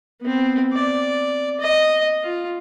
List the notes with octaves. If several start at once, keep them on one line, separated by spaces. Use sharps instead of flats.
B3 C4
D5
D#5
F4